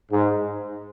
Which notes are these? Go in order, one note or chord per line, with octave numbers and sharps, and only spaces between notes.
G#2